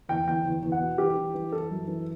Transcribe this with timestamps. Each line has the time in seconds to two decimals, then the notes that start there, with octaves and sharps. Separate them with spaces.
0.09 E2 G5
0.27 E2 G5
0.46 E2
0.63 E2
0.72 F#5
0.80 B2
0.98 E3 G4
1.17 E3
1.34 E3
1.52 E3 A4
1.70 F#2
1.88 E3